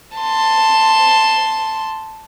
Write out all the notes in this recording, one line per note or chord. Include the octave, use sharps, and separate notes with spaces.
A5 C6